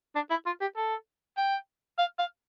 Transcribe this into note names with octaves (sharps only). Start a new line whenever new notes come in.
D4
E4
F4
G4
A4
G5
F5
F5